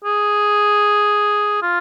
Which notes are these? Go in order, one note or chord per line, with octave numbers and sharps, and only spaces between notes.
G#4
F4